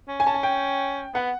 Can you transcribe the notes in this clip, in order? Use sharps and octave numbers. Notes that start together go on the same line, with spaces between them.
C#4
G#5
C#4 A5
G#5
G5
B3 F#5